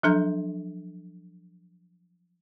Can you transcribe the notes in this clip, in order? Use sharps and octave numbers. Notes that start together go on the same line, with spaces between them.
F3 F#3 D4 A4 A#5 G6